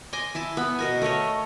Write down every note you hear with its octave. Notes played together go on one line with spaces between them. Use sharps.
D#5 G#5 C6 D6
E4 G#5 A5
B3 B5
B2 A#4 G#5
A3 A#4 C#5 D#5